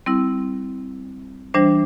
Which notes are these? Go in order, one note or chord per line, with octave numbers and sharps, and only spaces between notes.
G3 C4 E4
E3 G3 D4 C5